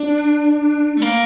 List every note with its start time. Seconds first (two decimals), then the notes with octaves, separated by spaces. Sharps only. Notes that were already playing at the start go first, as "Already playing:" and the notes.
Already playing: D4
0.97 A3
1.02 A#3